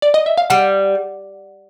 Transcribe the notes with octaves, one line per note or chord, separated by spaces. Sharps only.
D5
D#5
E5
F5
G3 F#5